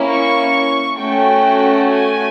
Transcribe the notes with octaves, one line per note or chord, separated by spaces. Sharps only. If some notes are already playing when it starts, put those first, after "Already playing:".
Already playing: A#3 C#4 E4
C#6
A3 C#4 F#4 G5
G#5